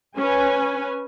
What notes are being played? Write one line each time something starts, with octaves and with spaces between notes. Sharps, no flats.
C#4 B4 G#5